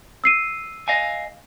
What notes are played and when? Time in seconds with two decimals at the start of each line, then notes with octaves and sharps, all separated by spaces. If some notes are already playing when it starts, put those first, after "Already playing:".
0.24 E6 C7 D#7
0.88 D#5 F5 G#5